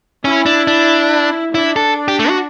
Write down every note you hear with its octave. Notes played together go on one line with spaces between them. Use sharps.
C#4 E4
D4
D4
D4 E4
A4
G4
A3
F#4